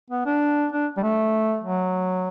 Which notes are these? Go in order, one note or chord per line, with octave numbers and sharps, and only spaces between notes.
B3
D4
D4
G3
A3
F#3